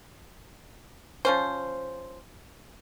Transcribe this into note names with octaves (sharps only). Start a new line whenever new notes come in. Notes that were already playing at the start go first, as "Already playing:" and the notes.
F3 C#4 C5